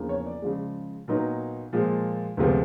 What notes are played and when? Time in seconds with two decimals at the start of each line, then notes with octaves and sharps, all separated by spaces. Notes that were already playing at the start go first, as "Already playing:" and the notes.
Already playing: E2 C#3 F3 A#3 D4
0.09 C#5
0.26 D5
0.42 C#3 F3 G#3
1.08 A#2 F#3 B3 D#4
1.73 A#2 F3 G#3
2.37 D2 C3 F3 G#3 B3